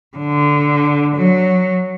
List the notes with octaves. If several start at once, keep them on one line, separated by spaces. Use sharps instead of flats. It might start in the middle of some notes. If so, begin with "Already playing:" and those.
D3
F#3